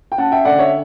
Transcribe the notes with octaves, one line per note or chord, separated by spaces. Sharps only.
G5
C#4 F#5 A5
E5 G5
D3 D5 F#5
C#5 E5